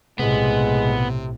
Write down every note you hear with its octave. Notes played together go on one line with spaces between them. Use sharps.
B1 A2 C3 G#3 B3